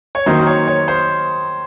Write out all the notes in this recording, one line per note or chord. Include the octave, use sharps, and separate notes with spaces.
C#5
D#3 F#3 A#3 D#4 C5
C#5
C#5
C5